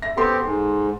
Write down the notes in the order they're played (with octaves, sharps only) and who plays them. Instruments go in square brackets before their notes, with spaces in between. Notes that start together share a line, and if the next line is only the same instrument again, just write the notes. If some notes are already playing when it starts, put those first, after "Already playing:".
[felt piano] E5 A#6
[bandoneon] B3 C4 G4 [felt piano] A4 C6
[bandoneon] G#2